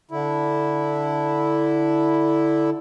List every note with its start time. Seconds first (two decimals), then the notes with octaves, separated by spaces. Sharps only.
0.11 D3 E4